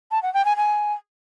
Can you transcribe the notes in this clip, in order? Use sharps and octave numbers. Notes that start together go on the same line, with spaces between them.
A5
F#5
G5
G#5
G#5